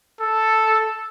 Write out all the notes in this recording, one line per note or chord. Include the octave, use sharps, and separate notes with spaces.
A4